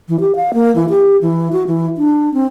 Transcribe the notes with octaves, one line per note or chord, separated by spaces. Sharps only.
E3
G4
F5
A#3
E3
G4
E3
F#4
E3
D4
C4